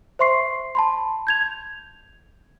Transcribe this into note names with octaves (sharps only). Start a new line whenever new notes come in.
C5 E5 C6 C#6 C7
A5 B5 C6
G6 G#6 F7